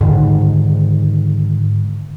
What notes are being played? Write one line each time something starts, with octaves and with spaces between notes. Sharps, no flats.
G#2 D3 D#3